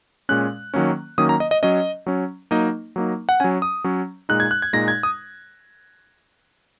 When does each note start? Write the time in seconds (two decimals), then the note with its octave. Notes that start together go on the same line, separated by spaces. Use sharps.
0.29 A#2 G#3 C#4 F#6
0.74 D#3 F#3 A#3 C#4
1.18 D#3 F#3 A#3 C#4 D#6
1.29 A#5
1.40 D#5
1.51 D#5
1.63 F#3 C#4 D#5
2.06 F#3 C#4
2.51 F#3 A#3 D#4 D#5
2.96 F#3 A#3 D#4
3.29 F#5
3.40 F#3 C#4 G#5
3.62 D#6
3.84 F#3 C#4
4.29 A#2 G#3 D#4 F#6
4.40 G#6
4.51 F#6
4.62 G#6
4.73 A#2 G#3 D#4 A#6
4.88 G#6
5.03 D#6